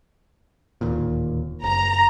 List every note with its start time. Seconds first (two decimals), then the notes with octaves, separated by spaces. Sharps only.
0.81 D1 D#2 A#2
1.64 F#1 A#5